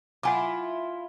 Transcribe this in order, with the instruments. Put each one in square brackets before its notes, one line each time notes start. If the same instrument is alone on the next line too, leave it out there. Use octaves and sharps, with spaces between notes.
[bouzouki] E4 F4 [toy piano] F#5 G#5 D6